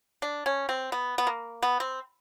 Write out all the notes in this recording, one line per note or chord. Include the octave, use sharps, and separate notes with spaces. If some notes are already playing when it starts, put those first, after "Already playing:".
D4
C#4
C4
B3
B3
A#3
B3
C4